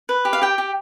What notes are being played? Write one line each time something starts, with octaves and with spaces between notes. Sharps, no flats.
B4
G4
F5
G4 G5
G4